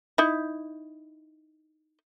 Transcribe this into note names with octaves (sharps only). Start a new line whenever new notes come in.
D#4 E4